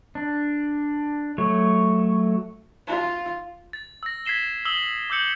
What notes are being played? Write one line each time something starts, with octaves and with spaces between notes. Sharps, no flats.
D4
F#3 A3 C#5
F4
A6
E6 A#6
G#6 B6 C7 E7 G7
D#6 E6 F#7 G7
D6 E6 G6 C#7 F#7